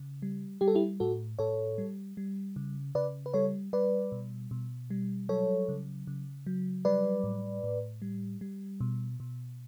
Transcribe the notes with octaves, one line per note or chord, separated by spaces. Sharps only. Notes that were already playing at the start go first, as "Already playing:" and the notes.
Already playing: C#3
G3
G3 G4
A4
E4 G4
A2 F#4 A4
A2 A4 C#5
G3
G3
C#3
C#3 B4 D5
B4
G3 A4 C#5
G3 B4 D5
B2
B2
G3
F#3 A4 C#5
C#3
C#3
F#3
G3 B4 D5
A2
A2
G3
G3
B2
B2